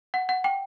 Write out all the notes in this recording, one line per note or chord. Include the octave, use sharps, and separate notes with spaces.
F#5
F#5
G5